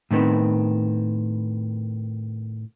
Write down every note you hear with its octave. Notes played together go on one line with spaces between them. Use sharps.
A2 D#3 B3 C4